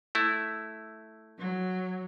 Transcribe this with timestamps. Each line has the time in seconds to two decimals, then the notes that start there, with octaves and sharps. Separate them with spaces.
0.15 A3 E4
1.37 F#3